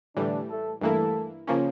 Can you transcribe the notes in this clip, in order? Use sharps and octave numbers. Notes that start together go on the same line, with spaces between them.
A2 D3 E3 G3 D4
A3 A4
G2 E3 A3 A#3 E4 A4
C#3 F3 A#3 C#4